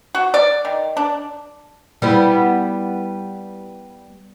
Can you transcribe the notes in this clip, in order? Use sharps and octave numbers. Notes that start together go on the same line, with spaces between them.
F#4
D5
D#3
D4
G3 B3 E4